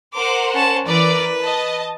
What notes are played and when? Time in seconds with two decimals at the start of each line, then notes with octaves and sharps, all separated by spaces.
0.14 A#4 C5 F#5 D6
0.54 C#4 A5
0.87 E3 A#4 B4 D5
1.39 D#5 A5